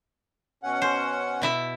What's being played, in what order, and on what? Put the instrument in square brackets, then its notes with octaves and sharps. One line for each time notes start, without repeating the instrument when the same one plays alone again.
[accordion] B2 C#4 F#5
[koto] C5
B2 E4 E5